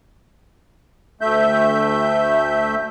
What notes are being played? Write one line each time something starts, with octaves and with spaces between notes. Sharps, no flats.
D2 A3 E5 G6